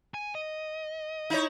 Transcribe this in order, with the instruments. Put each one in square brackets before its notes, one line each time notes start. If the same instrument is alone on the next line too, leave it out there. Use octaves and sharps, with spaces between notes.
[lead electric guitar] G#5
D#5
[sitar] D#4 E4 C#5